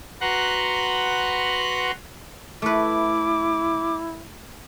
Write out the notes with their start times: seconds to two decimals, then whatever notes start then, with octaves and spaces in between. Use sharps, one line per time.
0.21 F#4 B4 F#5 A#5 C6 F#6
2.62 A3 E4 B4 D6